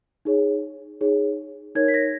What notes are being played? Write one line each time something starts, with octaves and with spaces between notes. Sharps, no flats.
D#4 G#4 C#5
D#4 G#4 C#5
D#4 A#4 C#5 G#6
B6
A#6